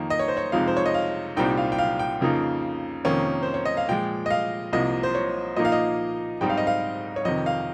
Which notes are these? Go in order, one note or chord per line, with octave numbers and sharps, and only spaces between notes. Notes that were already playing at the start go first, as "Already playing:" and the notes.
Already playing: F2 D#3 A#3 D#4
D#5
C#5
C5
C#5
F2 C3 F3 G#3 D#4 F5
C5
C#5
D#5
F5
C2 A#2 G3 C4 D#4 G5
F5
G5
F5
G5
F2 C#3 F3 A#3 D#4
F2 C3 D#3 A#3 C#4
C5
C#5
D#5
F5
A#2 F3 G#3 G5
D#5
F5
C2 C3 F3 A#3 D#5
C5
C#5
A#2 F3 A#3 D#4 D#5
F5
D#5
G#2 G3 C4 D#4 G5
F5
D#5
F5
C#5
F2 C3 D#3 D#5
F5